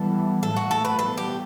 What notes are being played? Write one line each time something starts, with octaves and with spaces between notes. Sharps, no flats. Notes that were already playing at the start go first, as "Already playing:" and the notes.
Already playing: E3 G3 B3 A4
A2 F#3 A3 A4
F#4
A4
B4
E3 G3 B3 A4
G4